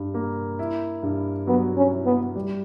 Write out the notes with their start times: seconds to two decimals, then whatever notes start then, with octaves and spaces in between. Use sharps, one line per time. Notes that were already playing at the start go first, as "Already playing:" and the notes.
Already playing: G2
0.14 A#3
0.59 E4
1.03 G2
1.47 F#3 B3
1.77 C#4
1.91 E4
2.06 B3
2.36 G3